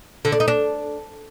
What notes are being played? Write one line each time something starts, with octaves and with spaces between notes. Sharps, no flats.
D3
D4
D#4
D4